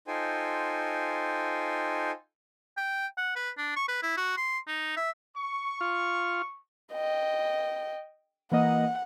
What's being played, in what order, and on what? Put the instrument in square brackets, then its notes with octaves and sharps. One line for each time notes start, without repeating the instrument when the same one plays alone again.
[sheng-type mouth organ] D#4 F4 A4 C5 G5 G#5
[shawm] G5
F#5
B4
D4
C#6
B4
E4
F#4
C6
D#4
E5
[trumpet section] C#6
[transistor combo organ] F4
[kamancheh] D#5 G5
[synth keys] E3 A#3 D#5 [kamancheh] F#5